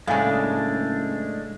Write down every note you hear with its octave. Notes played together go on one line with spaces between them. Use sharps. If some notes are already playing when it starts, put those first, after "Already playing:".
F#1 A2 C#3 G#3 A3 D4 F5 G#5